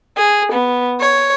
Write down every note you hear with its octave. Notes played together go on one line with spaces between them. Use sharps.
G#4
B3
C#5